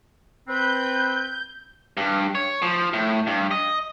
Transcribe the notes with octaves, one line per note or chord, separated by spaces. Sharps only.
C4 B4 G6
G2
C#5
F3
A2
G2
D#5